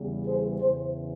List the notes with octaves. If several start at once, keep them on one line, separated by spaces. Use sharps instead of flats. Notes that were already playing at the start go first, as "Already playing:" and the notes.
Already playing: E2 C#3 E3 G3
G#4 C5
E2 C#3 E3 G#4 C5